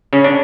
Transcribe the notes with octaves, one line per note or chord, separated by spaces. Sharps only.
C#3 C#4
D4